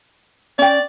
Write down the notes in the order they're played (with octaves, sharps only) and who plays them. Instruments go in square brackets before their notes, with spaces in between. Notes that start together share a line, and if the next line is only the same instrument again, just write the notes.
[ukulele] C#4 G5 [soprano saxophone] D5